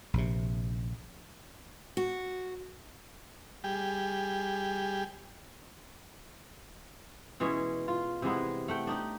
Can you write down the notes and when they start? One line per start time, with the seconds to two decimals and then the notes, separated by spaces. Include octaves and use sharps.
0.14 A#1 C3
1.97 F#4
3.64 G3 G4 G#4
7.40 B2 E3 G#3 C#4
7.88 F4
8.22 C3 E3 G#3 B3
8.68 A3 F#5 G5
8.87 D4 D#4 G4